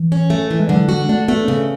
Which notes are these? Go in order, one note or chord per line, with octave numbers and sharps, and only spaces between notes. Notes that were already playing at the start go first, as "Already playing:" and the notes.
Already playing: E3
C#4
A3
E3
G#3
D3 F#3
G#3 F#4
A3 D4
A3 B3
C#3 B3